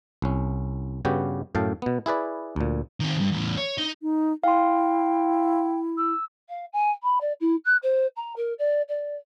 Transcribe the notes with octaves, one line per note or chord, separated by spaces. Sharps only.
C2 C#4
G2 C#3 B3 F#4 G4 G5
F#2 A2 F5 G5 A5
B2 B3
E4 G#4 B4 D5
D2 A#2
D#3 C4
C#2 G2
E2 A2
C#5
D#4
D#4
E4 F5 G5 C6
E6
F5
G#5
B5
D5
E4
F#6
C5
A#5
A#4
D5
D5